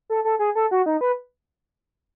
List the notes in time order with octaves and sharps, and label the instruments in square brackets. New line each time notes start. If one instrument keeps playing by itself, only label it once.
[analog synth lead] A4
A4
G#4
A4
F#4
D#4
B4